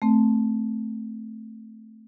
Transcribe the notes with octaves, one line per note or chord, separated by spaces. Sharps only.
A3 C4